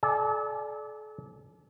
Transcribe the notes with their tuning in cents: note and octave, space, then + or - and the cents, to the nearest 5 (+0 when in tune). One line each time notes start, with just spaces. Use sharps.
A4 -40 D5 +0 G#5 +0